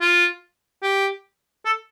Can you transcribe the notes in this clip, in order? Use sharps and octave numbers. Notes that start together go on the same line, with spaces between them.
F4
G4
A4